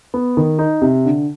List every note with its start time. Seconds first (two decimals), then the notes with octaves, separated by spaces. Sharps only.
0.14 B3
0.37 D#3
0.59 D#4
0.82 C3
1.05 D3